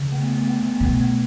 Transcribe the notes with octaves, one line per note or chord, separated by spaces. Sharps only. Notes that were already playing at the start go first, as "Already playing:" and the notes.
Already playing: C#3
A3
B3
A3
B3
A3
B3
A3
B3
B2 A3
B3
A3